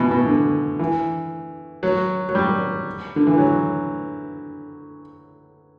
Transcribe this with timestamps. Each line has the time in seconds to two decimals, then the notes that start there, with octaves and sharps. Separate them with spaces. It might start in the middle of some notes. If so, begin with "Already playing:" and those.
Already playing: B2 E3
0.11 B2
0.27 D3
0.79 E3
1.83 F#3
2.29 F#3
2.35 G3
3.16 D3
3.27 E3
3.38 F#3